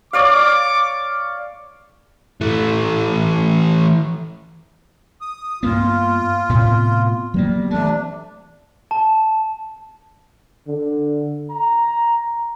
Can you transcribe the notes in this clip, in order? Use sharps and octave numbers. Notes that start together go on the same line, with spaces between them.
C#5 D5 F5 D6
E3 A3
D#6
G2 A#3 B3 F4
A2 C3 B3
F#3 G3 A#3 B3
C3 E3 A3 D4
A5
D3
A#5